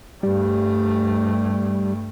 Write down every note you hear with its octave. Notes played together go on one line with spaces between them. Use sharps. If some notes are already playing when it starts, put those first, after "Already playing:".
G2 G3 A3